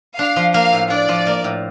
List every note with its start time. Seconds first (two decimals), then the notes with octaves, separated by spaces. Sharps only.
0.19 D4 F5
0.36 F3
0.54 A#3 F5
0.72 A2
0.90 D4 D5
1.09 F3
1.27 A#3
1.44 A2